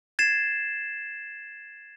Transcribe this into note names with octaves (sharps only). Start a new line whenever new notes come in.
G#6 A6 C7 E7